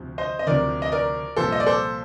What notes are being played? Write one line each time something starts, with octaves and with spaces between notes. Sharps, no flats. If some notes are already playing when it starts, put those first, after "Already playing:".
Already playing: D2 C3 F3
C5 D#5
D#5
D2 C3 F3 A#4 D5
D#5
A#4 D5
C2 A#2 F3 A4 C5
D#5
D5
A4 C5